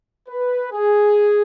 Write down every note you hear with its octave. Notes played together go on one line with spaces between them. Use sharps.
B4
G#4